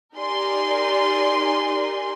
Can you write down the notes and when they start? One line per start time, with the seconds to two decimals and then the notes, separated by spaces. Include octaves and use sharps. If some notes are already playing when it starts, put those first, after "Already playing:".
0.16 D#4 G4 A#4 D5 G#5 C6